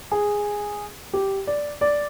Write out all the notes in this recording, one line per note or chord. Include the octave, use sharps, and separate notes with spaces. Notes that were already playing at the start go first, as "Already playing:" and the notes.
G#4
G4
D5
D5